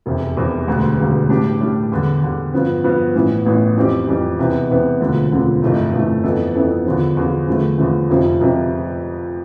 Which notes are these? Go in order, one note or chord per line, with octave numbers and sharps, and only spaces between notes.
F1 E2 C3
F1 E2 C3
E1 D2 D3 G3
E1 D2 D3 G3
A2 G3 D4 G4
A2 G3 D4 G4
E2 D3 G3
E2 D3 G3
G2 F3 B3
G2 F3 B3
A1 A2 E3 B3
A1 A2 E3 B3
F2 E3 G3 C4 G4
F2 E3 G3 C4 G4
E2 C3 E3 B3
E2 C3 E3 B3
E1 D2 D3 F3 C4
E1 D2 D3 F3 C4
G1 F2 C3 E3 A3
G1 F2 C3 E3 A3
F2 E3 B3 E4 A4
F2 E3 B3 E4 A4
E2 D3 F3
E2 D3 F3
E2 D3 F3 A3
E2 D3 F3 A3
F1 F2 C3 F3
F1 F2 C3 F3